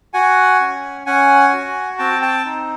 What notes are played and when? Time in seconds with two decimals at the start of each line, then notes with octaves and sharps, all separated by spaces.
0.14 F#4 F#5 G#5
0.61 C#4
1.06 C#4 F#5 G#5
1.53 F#4
1.99 C4 G5 A5
2.22 G5 A5
2.45 D#4